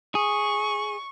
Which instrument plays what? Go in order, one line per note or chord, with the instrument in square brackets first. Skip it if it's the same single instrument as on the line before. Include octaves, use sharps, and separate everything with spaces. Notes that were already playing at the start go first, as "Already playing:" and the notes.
[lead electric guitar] G#4 [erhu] C#6